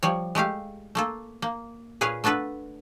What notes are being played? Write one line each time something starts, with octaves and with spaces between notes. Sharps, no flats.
F3 G3 C#5
G#3 A3 G4 F5
A3 A#3 A4
A#3
A#2 G#4 B4 C#5 F5
A3 B3 D4 A4 B4